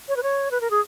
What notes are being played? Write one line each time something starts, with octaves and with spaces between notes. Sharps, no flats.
C#5
B4
C#5
B4
A#4
G#4